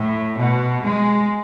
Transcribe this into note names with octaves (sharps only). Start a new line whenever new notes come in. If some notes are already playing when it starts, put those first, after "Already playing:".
Already playing: A2
B2
G#3